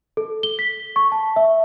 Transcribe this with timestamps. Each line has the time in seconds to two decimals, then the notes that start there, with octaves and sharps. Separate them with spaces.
0.17 A4
0.43 G7
0.59 B6
0.96 C#6
1.12 A5
1.36 E5